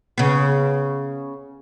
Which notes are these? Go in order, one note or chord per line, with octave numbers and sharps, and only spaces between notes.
C#3 B3